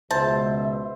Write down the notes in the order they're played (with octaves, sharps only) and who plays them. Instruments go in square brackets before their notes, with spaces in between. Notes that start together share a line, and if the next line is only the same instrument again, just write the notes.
[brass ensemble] C#2 B2 [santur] C5 [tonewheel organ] E5 [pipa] A5